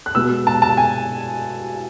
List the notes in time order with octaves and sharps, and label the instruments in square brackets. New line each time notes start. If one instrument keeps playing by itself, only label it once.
[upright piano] F#6
B2 G#3 B3 E6
A5
A5
G#5